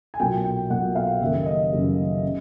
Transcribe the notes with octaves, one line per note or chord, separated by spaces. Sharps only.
G#5
B1 A#2 F#3 A#3 G5
G5
B1 A#2 F#3 A#3 F#5
F5
F#1 F#2 D#3 G3 A#3 E5
D#5
F#1 F#2 D#3 G3 A#3
C#3